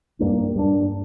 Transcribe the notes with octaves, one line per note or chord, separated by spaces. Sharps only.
G2 G3 A#3 D4
G2 G3 A#3 D4